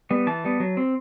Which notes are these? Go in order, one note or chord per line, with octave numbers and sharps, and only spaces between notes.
G3 B3
E3 A5
G3 B3
F#3
C4